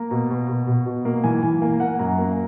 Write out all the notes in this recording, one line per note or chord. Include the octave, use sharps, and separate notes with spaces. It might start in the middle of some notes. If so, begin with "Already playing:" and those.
Already playing: A#3 A#5
B2
B2
B2
B2
B2
A#3
E3 G#5
E3 G#5
A#3 G#5
A#3 F#5
F#2 A#5
A#3